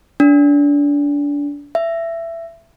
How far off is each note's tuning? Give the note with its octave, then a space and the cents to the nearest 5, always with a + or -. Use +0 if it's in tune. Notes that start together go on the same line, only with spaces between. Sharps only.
D4 -25
E5 +15